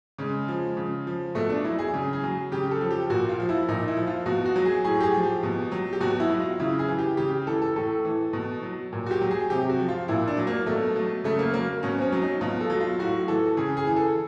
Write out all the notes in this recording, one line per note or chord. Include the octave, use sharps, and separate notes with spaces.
C#3 G#3
F3
C#3
F3
B2 A3
D4
F#3 E4
G#4
C#3
G#4
F#3
C#3 G4
A4
F3
G4
A#2 F#4
F4
F3
E4
A#2 D#4
E4
F3
F4
B2 F#4
F#4
F#3
G#4
A2 G#4
G4
G#4
F3
G4
B2
F#3
G4
B2 F#4
E4
F#3
F4
C#3 E4
G#4
E3
G4
C#3 G4
E3 A4
A4
A2 A4
E3
B2
F#3
A#2
F#4
G4
F#3
G#4
C3 G4
F#4
F3
F4
A#2 E4
D4
F#3
A#3
B2 A3
F#3
C#3 A3
A#3
F#3 A#3
B2 C#4
C4
C#4
F#3
D#4
B2 F4
A4
F#3
F4
A2 F#4
E3 A4
C#3 G#4
G#4
E3
A4